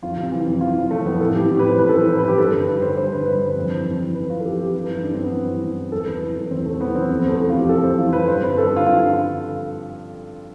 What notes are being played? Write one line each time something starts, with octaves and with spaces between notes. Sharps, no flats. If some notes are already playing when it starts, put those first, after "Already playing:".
F2 F4
C3
E3
F2
F2 F4
C3
E3 A3
F2 B3
A2 A4
E3 G4
A2 G4
B4
E3 C5
A2 B4
A4
E3 B4
A2 C5
B4
E3 G4
G2 A4
D3 B4
G2 B4
D3 C5
G2 C5
D3 B4
G2 B4
D3 C5
F2
E3
F2
E3
F2 B4
E3 F4
A4
F2 G4
E3 G4
G2 B4
B4
E3
E4
G2 D4
C4
E3
B3
G2
E3
G2
E3
E2 A4
C3 B4
E3
E2
E2 C4
C3 A3
E3 B3
E2 C4
F2 C4
B3
C3 A3
E3 A3
F4
F2 G4
F2 A4
C3 C5
E3 F4
F2 B4
G2 C5
D3 B4
G2 A4
D3 F4
G2 F4
D3